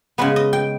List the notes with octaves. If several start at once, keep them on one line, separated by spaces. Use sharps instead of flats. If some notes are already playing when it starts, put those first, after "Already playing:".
C#3 G#3 B3 B4
D#5
G5